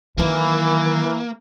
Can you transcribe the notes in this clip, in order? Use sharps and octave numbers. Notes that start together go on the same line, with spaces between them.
D#3 E3 F#3 A#3